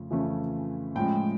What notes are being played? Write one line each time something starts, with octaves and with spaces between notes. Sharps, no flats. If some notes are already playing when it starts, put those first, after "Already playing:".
Already playing: F2 C#3 A3 C#4
F2 C#3 E3 A3 C#4
A2 F3 G#3 C#4 G5